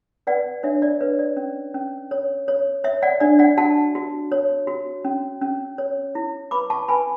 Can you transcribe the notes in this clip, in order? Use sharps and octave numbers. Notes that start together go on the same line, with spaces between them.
B4 D5 F#5
D4 C#5 E5
D5
B4 C#5
D5
C#4
C#4
C#5
C#5
C#5 E5
D5 F#5
D4 D5
D5 F#5
F#4 F#5 A5
F#4
C#5
F#4
C#4
C#4
C#5
E4
B4 B5 D6
A5 C#6
B4 G#5 B5